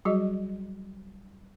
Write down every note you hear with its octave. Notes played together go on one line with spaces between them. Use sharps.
F#3 G3 F#4 G#4 D#5